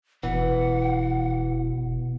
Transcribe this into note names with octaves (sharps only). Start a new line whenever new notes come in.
F1 B2 E3 F#5